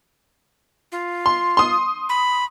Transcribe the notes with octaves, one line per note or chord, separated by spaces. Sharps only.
F4
C6
C6 D#6
B5